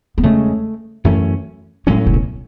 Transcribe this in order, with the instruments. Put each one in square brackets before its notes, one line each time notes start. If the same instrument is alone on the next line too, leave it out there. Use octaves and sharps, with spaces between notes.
[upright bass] B3
[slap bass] E2 C#3 G#3 C#4 [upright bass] A3
[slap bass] F#2 E3 A3 C#4
[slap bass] A2 F#3 C#4 [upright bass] G#3
[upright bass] C#3
B2